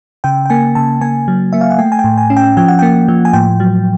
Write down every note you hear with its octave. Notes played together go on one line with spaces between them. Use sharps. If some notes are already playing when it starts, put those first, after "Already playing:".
C#3 G5
G5
A#3 G#5
C#3 A5
A#3 G#5
F#3
A#3 E5
F5
F#5
A3 G5
G#5
G5
A2
G#5
C#4
G5
F3 G5
F#5
A#3 G5
F3
G#5
A2 G5
F#3